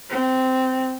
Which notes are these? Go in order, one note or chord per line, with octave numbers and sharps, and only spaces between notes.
C4